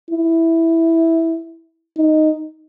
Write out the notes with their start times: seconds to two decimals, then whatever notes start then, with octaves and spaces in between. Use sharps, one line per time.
0.11 E4
1.97 D#4